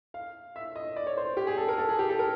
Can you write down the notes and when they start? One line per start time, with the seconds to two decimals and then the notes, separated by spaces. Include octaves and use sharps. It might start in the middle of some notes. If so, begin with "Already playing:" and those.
0.14 F5
0.56 E5
0.76 D#5
0.96 D5
1.07 C#5
1.17 C5
1.37 G4
1.47 G#4
1.58 A4
1.68 A#4
1.78 A4
1.89 G#4
1.99 G4
2.09 A4
2.19 A#4